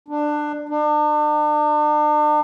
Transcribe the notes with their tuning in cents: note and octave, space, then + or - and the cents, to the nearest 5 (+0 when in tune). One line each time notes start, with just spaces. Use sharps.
D4 +20
D4 +40